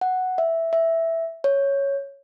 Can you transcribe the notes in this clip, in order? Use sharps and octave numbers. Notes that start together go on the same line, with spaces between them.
F#5
E5
E5
C#5